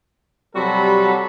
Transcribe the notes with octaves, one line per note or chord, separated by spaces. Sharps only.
C3 F#3 G3 F#4 A4 B5